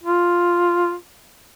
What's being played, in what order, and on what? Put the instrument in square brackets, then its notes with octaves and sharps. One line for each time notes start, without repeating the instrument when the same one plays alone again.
[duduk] F4